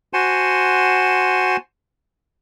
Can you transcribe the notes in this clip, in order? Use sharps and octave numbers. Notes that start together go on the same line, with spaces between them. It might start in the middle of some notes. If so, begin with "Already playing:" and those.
F#4 C5 F#5 G#5 A5 C6